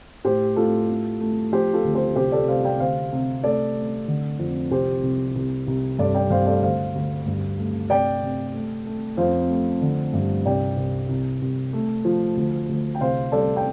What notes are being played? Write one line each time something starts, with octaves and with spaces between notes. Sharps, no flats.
A2 G4 C5
A2 F4 A4
A3
A3
F3 G4 C5
F4 A4
D2
G4 C5
C2 G4 C5
A4 D5
C3 C5 F5
D5 G5
D2 C5 F5
C3
A3 A4 D5
A3
D3
F2
C2 G4 C5
C2
C2
C2
G2 A4 D5
D5 G5
G2 C5 F5
A4 D5
D2 C5 F5
D2
G2
A3
C3 D5 G5
C3
A3
A3
F2 C5 F5
A3
D3
G2
C2 D5 G5
C2
C2
C2
A3
F3
D2
D2
G5
C2 C5 F5
G3 A4 D5
G5